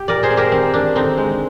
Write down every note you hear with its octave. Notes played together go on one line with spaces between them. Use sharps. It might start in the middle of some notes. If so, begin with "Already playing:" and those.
Already playing: G4
A#2 A#4 D5
G#4 C5
C4
G4 A#4
D#3 C4
D#3 D4
D3 C4 D#4
G#3